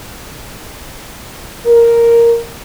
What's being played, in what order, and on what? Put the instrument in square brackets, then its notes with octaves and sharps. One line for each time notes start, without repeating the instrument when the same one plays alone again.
[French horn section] A#4